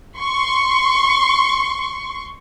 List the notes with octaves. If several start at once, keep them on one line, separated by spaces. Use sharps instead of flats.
C6 C#6